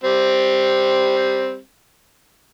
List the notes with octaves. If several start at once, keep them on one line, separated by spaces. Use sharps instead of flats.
G3 C4